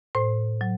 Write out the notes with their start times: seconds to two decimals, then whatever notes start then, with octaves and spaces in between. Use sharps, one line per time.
0.15 A2 C5
0.61 F#3